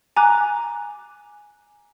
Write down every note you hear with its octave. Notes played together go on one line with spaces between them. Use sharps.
G#5 A#5 D6 F#6